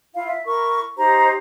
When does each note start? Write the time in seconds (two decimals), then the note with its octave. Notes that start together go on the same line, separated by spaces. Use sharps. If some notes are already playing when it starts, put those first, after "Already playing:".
0.14 E4 F4 F5
0.28 E5
0.45 E4 A#4 C#6
0.97 D#4 G4 C5 A#5